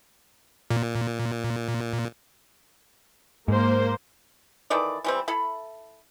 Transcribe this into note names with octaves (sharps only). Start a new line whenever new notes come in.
A#2
G#2 A#3 C5
D#3 E3 A4 D5
E3 G3 C4
E4 A4 B5